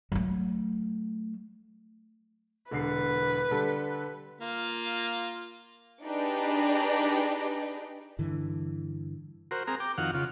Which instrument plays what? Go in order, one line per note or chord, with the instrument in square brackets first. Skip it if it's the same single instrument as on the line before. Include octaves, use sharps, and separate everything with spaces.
[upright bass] F#3 A3
[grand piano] E1 D3 C7 [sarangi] B4
[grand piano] D3 G3 A4
[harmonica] A#3 F4
[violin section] D4 D#4 G4 G#4 B4 D5
[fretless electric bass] G2 D3 E3
[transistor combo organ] F#4 A#4 C5
C4 G#4 A#4 A#5
G5 D6
F2 D#3 F#4 F5 F#5
C#3 F4